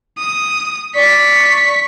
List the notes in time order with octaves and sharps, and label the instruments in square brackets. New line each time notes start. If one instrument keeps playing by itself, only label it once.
[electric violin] D#6
[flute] D5 [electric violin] C#6 B6